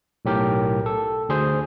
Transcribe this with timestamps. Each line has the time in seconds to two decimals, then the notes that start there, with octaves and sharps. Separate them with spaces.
0.25 B1 A2 G4 A#4 G5
0.86 A4
1.29 D2 G#4 C5